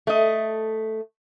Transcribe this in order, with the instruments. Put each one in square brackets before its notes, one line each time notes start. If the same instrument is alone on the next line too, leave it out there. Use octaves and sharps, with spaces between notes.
[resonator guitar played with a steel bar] A3 D#5